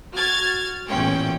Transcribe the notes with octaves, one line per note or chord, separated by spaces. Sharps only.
F#4 F6 G#6 A6
A1 E2 A#2 C#4 G5